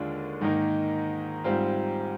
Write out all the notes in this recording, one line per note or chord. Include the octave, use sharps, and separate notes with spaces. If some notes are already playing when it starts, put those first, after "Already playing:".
Already playing: D#2 D3 G#3 D4 F4
G#2 D#3 A#3 D#4
G#2 G3 C4 F4